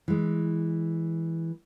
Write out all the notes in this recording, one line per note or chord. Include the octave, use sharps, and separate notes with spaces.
E3 G#3